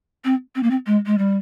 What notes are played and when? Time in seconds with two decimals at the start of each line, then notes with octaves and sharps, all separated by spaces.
0.25 C4
0.55 C4
0.63 A#3
0.70 C4
0.87 G#3
1.06 G#3
1.18 G3